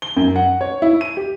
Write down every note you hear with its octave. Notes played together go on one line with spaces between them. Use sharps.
G7
F#2
F#5
C#5
E4
D#7
G4